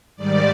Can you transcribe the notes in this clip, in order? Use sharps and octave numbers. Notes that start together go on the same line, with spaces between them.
G#2 D#3 G3 D5